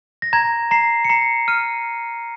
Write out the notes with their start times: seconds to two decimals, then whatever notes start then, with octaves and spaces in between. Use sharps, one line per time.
0.22 A#6
0.33 A#5 G#6
0.71 A#5 C7
1.05 C#7
1.10 A#5 C7
1.48 F6 D#7